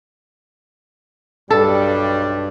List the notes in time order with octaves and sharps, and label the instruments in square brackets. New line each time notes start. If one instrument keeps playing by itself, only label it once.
[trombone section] B1 G3 D4 [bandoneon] G2 [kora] A4